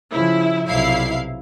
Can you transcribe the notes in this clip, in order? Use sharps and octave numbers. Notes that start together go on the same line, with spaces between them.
C#3 F3 E4
B1 C3 E4 F5 C7